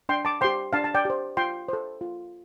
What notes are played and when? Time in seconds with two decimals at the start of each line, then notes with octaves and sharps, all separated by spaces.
0.09 D4 G5 C6
0.25 A5 D6
0.41 G4 C5 G5 C6
0.73 D4 F5 A5
0.84 A5
0.94 D5 G5
1.05 G4 C5
1.37 F4 G5 C6
1.68 A4 C5
2.01 F4